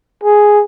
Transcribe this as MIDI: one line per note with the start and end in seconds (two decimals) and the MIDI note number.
0.24 0.63 68